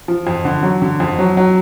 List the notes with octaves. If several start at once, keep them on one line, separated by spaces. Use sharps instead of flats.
F3
F2
D3
F#3
D3
F2
F#3
F#3